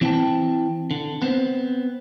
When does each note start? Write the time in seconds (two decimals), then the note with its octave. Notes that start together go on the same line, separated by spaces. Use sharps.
0.01 E3 C4 E4 D#5 G5 A5
0.91 D3
1.22 B3 C4 C5